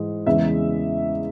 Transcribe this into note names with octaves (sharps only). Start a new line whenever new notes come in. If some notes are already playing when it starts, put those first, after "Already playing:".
Already playing: G#2 E3 G#3
E2 C#3 E3 G#3 E5